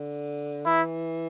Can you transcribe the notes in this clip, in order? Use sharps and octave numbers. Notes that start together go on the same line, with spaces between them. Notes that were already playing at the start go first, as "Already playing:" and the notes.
Already playing: D3
E3 E4